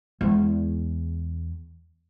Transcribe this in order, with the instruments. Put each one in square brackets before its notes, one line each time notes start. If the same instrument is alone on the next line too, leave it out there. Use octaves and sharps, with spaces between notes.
[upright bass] E2 G#3